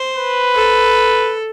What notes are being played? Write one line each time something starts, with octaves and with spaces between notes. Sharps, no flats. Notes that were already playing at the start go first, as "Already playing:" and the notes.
Already playing: C5
B4
A4